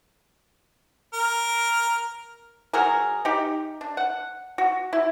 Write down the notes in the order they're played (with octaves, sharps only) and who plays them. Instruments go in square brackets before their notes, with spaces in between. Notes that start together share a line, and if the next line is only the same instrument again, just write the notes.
[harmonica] A#4
[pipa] F#3 G#4 A#4
D#4 G4
D4
F#5
F#4
E4